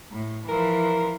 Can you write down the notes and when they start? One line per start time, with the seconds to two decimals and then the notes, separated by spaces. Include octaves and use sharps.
0.11 A2
0.48 E3 F3 A#4